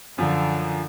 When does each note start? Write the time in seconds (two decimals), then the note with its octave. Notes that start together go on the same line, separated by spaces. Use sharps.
0.18 F#2 D3 F3